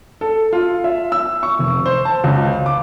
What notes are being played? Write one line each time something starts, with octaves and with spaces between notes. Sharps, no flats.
A4
F4
E5
E6
C#6
F1
C5
A5
C#2
D6